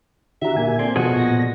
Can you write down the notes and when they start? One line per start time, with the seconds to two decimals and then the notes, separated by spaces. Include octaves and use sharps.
0.42 D3 E4 F#4 G4 E5 A#5
0.57 A#2 D3 A#3 G#5
0.79 C4 A4 D5
0.96 B2 F3 F#4 G#4
1.16 A#2 A#6